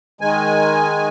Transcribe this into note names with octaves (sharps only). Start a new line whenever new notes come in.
D#3 G#3 G#5